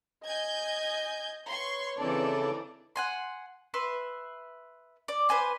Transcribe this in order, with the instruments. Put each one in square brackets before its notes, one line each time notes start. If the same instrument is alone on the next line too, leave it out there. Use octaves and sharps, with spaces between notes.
[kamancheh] D#5 [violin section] G#5 G6 G#6
[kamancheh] B4 C#5 [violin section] C6 C#6
[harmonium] C#3 A4 A5 [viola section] E3 C4 D5 [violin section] D4 D#4
[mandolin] F#5 G#5 C6
B4 E5 C6
D5
B4 C5 G#5 C6